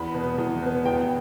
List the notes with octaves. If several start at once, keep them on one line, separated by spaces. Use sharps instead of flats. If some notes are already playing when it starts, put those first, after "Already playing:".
Already playing: E2 B5
B2 B3
E2
B2 B3
E2 G5